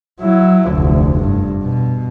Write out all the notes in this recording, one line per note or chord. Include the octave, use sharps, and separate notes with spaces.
F#3 E4
F1 D2
G2
B2